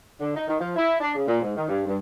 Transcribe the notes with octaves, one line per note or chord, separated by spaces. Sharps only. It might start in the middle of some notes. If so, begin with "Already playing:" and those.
D3
D#4
D#3
F3
E4
D4
C#3
A#2
G#2
D#3
G2
G2